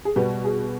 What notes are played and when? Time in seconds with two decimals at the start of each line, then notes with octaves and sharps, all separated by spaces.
0.05 G#4
0.16 B2 G3 B3 G4
0.45 G#4